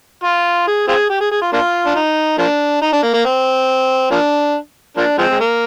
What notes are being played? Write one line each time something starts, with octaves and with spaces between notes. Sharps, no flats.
F4
G#4
C4 F4 G#4
G4
G#4
G#4
F4
A#3 D4 F4
D4
D#4
F3 A#3 D4
D#4
D4
A#3
A#3
C4
F3 A#3 D4
F3 A#3 D4
F3 G#3 C4
G#3
A#3